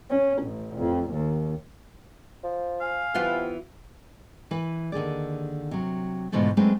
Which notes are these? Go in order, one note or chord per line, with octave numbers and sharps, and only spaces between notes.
C#4
A1
F2
D#2
F3
F5 G#5
C3 E3 B3 F4
E3 B4
D#2 D3 G#4 D5
C3 F#3
G#2 B2 D3 E3 F3 A3
F#3 G#3 A3 C4 D4 B4